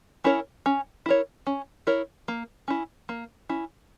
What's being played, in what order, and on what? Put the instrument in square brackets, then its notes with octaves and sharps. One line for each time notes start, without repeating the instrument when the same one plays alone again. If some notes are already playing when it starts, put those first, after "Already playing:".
[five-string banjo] C#4 E4 A#4 C#5
C#4
E4 A#4 C#5
C#4
E4 A#4 C#5
A#3
C#4 E4
A#3
C#4 E4